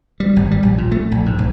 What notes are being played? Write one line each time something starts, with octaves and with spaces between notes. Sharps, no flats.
G3
G#1
G3
A#1
A#2
A3
A#1
G#2
B1